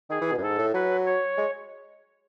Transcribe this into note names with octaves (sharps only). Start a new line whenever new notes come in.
D#3 G#4
E3
B2
F#2
G#2 A4
A2
F#3 B4
C#5
G#3